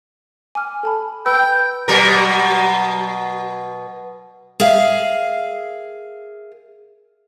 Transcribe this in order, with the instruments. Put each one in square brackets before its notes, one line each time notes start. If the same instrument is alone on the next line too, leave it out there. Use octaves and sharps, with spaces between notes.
[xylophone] G#5 D6 F6
A4 A5 B5
[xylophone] B4 B5 E6 [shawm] G5
[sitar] B2 F#3 A#4
[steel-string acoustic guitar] G#4 A#4 E5 F5